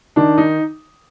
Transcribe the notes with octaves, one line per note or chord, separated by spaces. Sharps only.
D#3 D4
D#4